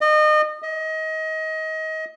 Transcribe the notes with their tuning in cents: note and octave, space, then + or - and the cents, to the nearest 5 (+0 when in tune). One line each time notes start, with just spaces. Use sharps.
D#5 -30
D#5 +25